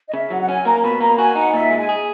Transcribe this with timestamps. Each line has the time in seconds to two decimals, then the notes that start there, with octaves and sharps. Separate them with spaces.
0.09 D#5
0.13 C#3 E5
0.30 F#3 F#5
0.41 F#5
0.48 C#4 G#5
0.65 A#3 A#5
0.83 B2 B5
1.01 A#3 A#5
1.18 F#4 G#5
1.35 D#4 F#5
1.53 A#2 E5
1.70 G#3
1.77 G#5
1.89 G#4